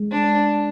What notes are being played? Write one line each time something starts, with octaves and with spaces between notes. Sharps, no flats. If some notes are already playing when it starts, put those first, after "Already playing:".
Already playing: G#3
D4